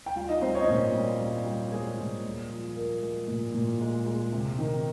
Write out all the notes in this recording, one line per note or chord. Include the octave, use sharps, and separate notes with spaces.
G5
G3 F4 F5
D#4 D#5
G3 C4 C5
C#4 C#5
D#5
A#2 C#4 C#5
G3
G3
G3
G3 G#3 G#4
A#2
G#3
F3
F3 A#3 A#4
G#3
A#2
A#2
G#3
G#3
C3
D#3